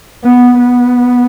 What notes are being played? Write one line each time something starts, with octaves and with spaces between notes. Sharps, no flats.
B3
B3